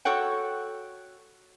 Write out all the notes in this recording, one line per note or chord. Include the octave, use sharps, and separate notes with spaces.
F#4 A4 C#5 F#5 G5